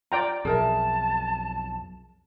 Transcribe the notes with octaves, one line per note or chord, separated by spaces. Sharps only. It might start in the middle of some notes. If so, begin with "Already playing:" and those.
F4 D5 G5 A#5
B1 F2 G#4 A#4 E5 A5